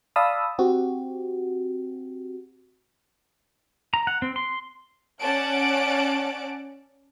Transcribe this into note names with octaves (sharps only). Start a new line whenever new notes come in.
D5 F5 A5 B5 D#6 E6
C4 F#4 G4
A#5
F#5
C4
C6
C#4 D5 F#5 A5 F#6 D7